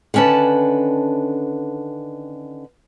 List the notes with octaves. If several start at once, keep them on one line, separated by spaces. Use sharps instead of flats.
D3 D#3 C#4 B4 A5